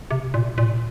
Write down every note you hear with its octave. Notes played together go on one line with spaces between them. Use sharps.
C3
A#2
A#2
A2
A#2